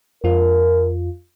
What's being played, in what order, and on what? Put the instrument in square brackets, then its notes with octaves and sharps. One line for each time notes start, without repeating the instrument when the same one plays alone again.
[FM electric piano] F2 F4 [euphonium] A#4